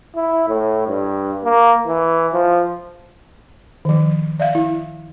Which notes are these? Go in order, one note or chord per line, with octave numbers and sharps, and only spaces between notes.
E4
A2
G2
A#3
E3
F3
D#3 F3
D5 E5 F5
E4